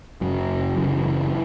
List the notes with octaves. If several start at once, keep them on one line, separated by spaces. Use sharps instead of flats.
F#1 F#2 C#3 F#3
F#1 F#2 C#3 E3